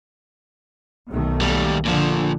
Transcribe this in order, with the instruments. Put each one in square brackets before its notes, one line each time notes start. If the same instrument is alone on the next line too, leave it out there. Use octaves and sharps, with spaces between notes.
[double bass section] B1 D#3 A3
[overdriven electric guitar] D#2 G3
[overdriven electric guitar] A#2 F3 [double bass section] D3